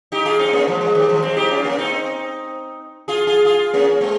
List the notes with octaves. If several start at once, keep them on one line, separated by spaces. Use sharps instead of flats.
D#4 G4
F4 G#4
C4 D#4
A#3 C#4
F3 G#3
F3 G#3
D#3 G3
F3 G#3
G#3 C4
D#4 G4
C#4 F4
A#3 C#4
C4 D#4
F4 G#4
F4 G#4
F4 G#4
A#3 C#4
G#3 C4